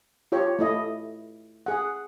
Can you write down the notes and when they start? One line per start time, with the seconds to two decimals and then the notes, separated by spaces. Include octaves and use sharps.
0.32 F4 G4 C#5
0.59 A3 E4 D#5
1.66 G#4 F#5